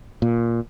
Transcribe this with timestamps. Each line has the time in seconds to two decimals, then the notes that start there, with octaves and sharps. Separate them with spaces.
0.22 A#2